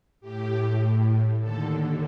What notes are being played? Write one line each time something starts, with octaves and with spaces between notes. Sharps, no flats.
A2 G4
D#2 D3 A4